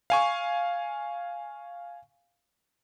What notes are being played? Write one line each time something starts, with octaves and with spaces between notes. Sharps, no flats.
F5 G#5 C#6